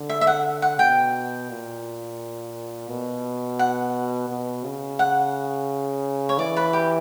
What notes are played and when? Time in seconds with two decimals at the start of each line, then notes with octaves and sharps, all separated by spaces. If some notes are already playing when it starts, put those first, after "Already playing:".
Already playing: D3
0.09 E5
0.21 E5
0.27 F#5
0.62 F#5
0.79 B2 G5
1.50 A#2
2.89 B2
3.59 F#5
4.29 B2
4.64 C#3
4.99 F#5
6.29 C#5
6.39 E3 D5
6.57 B4
6.73 G4